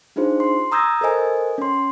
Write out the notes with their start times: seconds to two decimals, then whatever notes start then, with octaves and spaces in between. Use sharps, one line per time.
0.16 D4 D#4 F4 G#4 C5
0.40 C6
0.72 A#5 D#6 E6 G6 G#6 A#6
1.01 A4 A#4 C5 D#5 G#5
1.58 C#4 C6